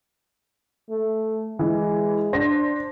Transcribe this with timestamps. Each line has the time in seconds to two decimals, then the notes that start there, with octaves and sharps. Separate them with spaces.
0.90 A3
1.59 E3 G#3
2.33 D4 C5 A#6